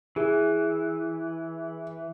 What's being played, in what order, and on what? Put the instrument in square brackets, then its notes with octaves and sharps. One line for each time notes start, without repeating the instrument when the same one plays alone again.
[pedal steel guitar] E3 [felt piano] G#4